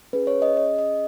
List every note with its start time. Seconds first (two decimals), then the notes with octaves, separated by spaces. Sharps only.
0.13 C#4 G#4 B4
0.27 C#5
0.42 D#5
0.57 D#5
0.78 D#5